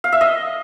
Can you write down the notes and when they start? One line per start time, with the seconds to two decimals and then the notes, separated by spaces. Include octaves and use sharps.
0.04 F5
0.12 E5
0.21 D#5